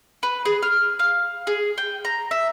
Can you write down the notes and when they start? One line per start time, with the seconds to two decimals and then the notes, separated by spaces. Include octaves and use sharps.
0.23 B4
0.45 G#4
0.63 F6
0.99 F5
1.47 G#4
1.78 G5
2.05 A#5
2.31 E5